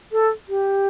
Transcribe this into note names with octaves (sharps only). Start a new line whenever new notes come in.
A4
G4